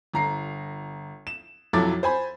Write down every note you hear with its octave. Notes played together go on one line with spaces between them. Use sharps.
G1 A#5 C7
E7
B1 F2 F#3 E4 D6 A6
C5 G#5 B5